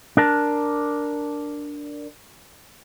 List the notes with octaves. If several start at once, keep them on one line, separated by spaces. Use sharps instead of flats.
D4 A#4 A5